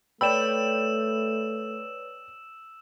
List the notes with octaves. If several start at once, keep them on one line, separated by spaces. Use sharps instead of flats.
A3 B4 C#5 D5 G5 B5 E6 E7